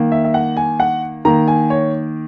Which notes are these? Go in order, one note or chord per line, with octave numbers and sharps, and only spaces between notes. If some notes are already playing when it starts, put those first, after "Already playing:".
Already playing: D#3 A#3
E5
E5
F#5
G#5
F#5
D#3 A#3 A#5
G#5
C#5